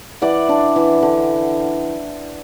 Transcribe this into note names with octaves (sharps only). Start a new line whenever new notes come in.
E3 D5 F#5
D4
E3
D3